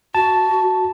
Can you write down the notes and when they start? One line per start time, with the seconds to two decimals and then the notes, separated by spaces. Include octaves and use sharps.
0.15 F#4 A5